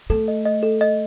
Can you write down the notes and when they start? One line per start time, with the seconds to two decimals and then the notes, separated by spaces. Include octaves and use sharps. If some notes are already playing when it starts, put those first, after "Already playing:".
0.10 A3 A4
0.28 D#5
0.45 D#5
0.63 A4
0.81 D#5